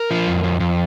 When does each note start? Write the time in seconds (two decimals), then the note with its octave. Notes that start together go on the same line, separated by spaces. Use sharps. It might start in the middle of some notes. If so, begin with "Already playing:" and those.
Already playing: A#4
0.11 F3
0.28 F2
0.44 F2
0.60 F2